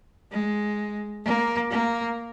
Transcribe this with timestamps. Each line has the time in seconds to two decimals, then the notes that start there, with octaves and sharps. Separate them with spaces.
0.31 G#3
1.25 A#3
1.70 A#3